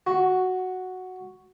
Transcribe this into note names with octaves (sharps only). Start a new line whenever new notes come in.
F#4